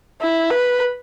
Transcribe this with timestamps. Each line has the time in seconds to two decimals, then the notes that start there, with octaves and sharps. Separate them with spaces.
0.21 E4
0.50 B4